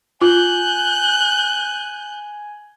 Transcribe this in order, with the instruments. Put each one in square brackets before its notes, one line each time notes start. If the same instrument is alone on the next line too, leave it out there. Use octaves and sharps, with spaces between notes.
[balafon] F4 [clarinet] G#5 [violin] F#6 G6